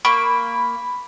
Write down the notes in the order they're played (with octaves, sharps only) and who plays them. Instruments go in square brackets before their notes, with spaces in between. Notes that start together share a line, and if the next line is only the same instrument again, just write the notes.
[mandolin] A#3 [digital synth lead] B5 [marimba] C#6